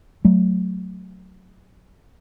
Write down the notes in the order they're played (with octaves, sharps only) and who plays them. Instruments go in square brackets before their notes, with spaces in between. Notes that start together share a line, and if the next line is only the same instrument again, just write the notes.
[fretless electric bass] F#3 A3